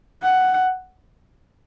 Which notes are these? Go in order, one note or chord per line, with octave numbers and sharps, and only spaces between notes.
F#5